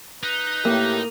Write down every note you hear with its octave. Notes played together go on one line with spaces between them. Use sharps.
D#4 B4
A2 A#3 G4